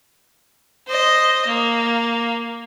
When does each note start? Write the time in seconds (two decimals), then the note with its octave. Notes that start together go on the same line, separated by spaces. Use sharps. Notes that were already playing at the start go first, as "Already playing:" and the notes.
0.87 C5 D#5
1.46 A#3